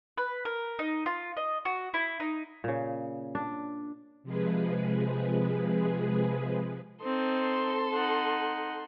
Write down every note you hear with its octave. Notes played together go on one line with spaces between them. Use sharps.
B4
A#4
D#4
F4
D#5
F#4
E4
D#4
A#2 C#3
D4
C3 F3 G#3 G#4 B4
C4 D#4 A4 C6
D#4 F#5